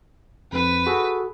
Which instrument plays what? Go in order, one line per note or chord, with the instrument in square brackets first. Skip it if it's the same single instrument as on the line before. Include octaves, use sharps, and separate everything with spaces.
[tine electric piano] F2 [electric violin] B4
[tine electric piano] F#4 G#4 A4